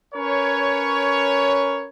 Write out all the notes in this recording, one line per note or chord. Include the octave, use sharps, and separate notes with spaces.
C#4 A#4 B4 C#5